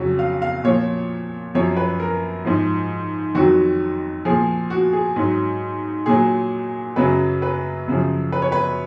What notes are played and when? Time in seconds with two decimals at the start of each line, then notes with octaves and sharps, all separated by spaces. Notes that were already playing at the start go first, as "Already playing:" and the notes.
Already playing: F2 C#3 F#3 F#4
0.19 F5
0.42 F5
0.64 A#2 F3 C#5
1.55 F#2 F3 C#5
1.77 B4
2.00 A#4
2.45 G#2 F3
3.35 F2 D#3 F#3 F#4
4.25 A#2 F3 G#4
4.70 F#4
4.93 G#4
5.16 G#2 F#3
6.06 A#2 F#3 G#4
6.96 F#2 C#3 F#3 B4
7.42 B4
7.88 F#2 C#3 F3
8.32 B4
8.42 C#5
8.52 B4